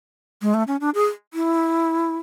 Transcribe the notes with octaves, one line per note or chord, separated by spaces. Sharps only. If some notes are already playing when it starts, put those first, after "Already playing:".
G#3
A3
C#4
D4
G#4
E4